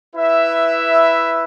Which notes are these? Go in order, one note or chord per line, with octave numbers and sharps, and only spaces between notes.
E4 B4 E5